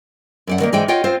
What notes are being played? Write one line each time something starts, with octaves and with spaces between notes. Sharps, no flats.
F#2 D5 F#5
D#3 A3 A#3
G#2 E3 G#3 D#4 D5 G5
F4 C#5 D#5 F#5 G5
C4 F4 C5 F5